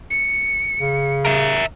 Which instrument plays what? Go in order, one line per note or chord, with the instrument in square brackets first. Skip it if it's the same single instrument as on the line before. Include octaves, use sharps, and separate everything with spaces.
[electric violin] C#7
[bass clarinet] C#3
[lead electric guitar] A#4 E5